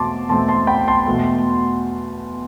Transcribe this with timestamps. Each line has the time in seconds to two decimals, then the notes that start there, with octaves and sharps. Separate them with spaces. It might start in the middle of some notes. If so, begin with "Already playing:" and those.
Already playing: E2 B2 A3 C4 A5 C6 D6
0.29 E2 B2 A3 C4 A5 C6
0.48 A5 C6
0.67 G5 B5
0.87 A5 C6
1.06 E2 B2 A3